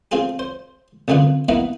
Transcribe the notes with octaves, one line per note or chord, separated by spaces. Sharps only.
C4 F4 G#4 A4
C5
C2 F#2 D3 F4 B4
A#3 B3 D#4 E4 B4